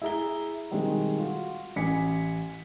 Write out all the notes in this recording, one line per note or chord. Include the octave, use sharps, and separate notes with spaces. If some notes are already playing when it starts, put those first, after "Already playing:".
E4 G#4 A#5 G7
B2 D#3 G3 G#3 C4
F4 F#4
A1 G#5 B6 C#7